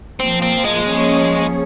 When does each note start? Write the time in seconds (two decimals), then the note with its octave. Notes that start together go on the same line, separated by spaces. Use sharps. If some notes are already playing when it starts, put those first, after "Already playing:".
0.20 A#2 F3 A#3 C4
0.42 C4
0.64 G#3
0.87 F3 A#3 C#4 G#4 C#5